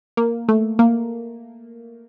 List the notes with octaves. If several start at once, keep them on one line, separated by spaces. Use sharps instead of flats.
A#3
A3
A#3